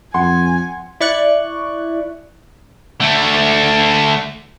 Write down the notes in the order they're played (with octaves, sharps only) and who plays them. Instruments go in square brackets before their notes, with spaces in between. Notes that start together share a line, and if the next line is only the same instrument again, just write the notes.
[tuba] F2 [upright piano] F#5 C6 [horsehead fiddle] G#5
[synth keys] E4 D5 C#6 F#6
[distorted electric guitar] D3 A3